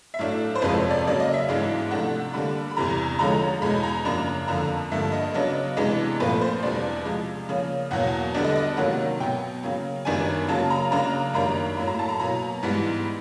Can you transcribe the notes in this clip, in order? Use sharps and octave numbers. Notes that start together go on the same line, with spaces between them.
E5
A2 F#3 A3 D4 F5
C5
F2 C3 F3 G#3 B4
C#5
D5
C#3 F#3 A#3 D5
D#5
E5
G#2 E3 G#3 B3 D4 F5
C3 F3 A3 D4 F#5
D3 G3 A#3 D4 B5
B5
E2 C3 E3 G3 A#5
D3 F3 G#3 C#4 A#5
E2 B2 G#3 B5
A#5
F#2 C#3 F3 A#3 D4 A#5
F2 D3 F3 A#3 D4 A#5
G2 D3 F3 A#3 E5
D#5
C#3 F#3 B3 D4
C3 E3 G#3 B3 D4
A#2 F3 A3 C4 B4
C5
E2 B2 G3 B3 D4 D5
C3 F3 G#3
C#3 F3 A#3 C#4
E2 B2 F#3 A#3 F#5
D3 G3 B3 D4
D#5
D#5
C3 D#3 F#3 A#3 C#4 F#5
B2 F#3 B3 G5
C#3 F#3 A#3
F#2 D#3 G3 B3 D4 G#5
C#3 F#3 A#3 A5
A#5
C#3 F#3 A#3 D4 A#5
F#2 D#3 G3 A#3 D4 A#5
A2 F#3 A#3 B5
A#5
A5
A#5
B2 F#3 A#3 A#5
G#2 E3 G3 B3